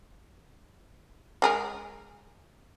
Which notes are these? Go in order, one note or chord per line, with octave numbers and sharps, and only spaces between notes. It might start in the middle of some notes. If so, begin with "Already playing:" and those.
G#3 G#4 A#4